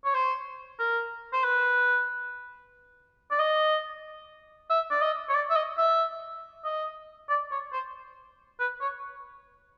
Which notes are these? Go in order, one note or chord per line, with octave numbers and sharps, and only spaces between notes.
C#5
C5
A#4
C5
B4
D5
D#5
E5
D5
D#5
C#5
D5
E5
D#5
E5
D#5
D5
C#5
C5
B4
C#5